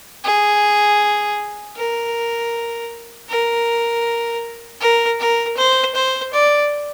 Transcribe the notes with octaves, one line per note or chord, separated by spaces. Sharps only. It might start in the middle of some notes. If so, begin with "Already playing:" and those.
G#4
A#4
A#4
A#4
A#4
C5
C5
D5